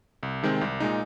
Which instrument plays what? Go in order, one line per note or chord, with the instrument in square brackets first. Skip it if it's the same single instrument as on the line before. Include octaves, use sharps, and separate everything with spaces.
[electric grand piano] C2
C3 D#3 G#3 C4
C2
A#2 G#3 D#4